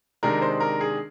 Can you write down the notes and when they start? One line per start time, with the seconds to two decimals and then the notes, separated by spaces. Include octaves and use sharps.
0.23 C3 D#3 G#3 D4 A#4
0.42 C5
0.60 A#4
0.81 G#4